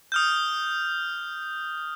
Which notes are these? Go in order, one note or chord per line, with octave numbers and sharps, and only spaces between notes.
D#6 F6 G6